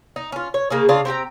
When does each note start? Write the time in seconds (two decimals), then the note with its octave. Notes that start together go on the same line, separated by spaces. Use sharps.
0.16 D#4
0.32 C#4 F4
0.54 C#5
0.70 C#3 A#3 D#4 G#4
0.89 C#3 D4 F4
1.05 C4 G4 G5 A#5